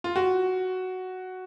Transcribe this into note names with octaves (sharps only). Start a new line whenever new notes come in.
F4
F#4